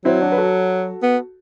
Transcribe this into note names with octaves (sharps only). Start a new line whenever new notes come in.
F#3 C4 E4
D4 F#4
B4
F#4 A4
B3